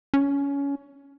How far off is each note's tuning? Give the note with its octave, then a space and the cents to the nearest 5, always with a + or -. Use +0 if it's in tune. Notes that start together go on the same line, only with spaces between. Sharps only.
C#4 +20